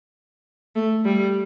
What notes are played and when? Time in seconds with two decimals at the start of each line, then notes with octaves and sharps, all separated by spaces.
0.76 A3
1.05 G3